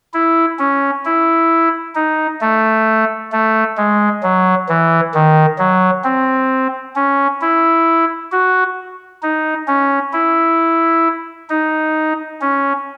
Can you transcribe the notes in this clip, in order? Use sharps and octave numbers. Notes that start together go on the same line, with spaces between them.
E4
C#4
E4
D#4
A3
A3
G#3
F#3
E3
D#3
F#3
C4
C#4
E4
F#4
D#4
C#4
E4
D#4
C#4